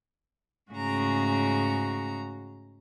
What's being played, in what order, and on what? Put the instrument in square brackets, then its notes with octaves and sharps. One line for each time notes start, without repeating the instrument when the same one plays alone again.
[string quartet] G#2 C#3 A3 F#4 G#4 A#5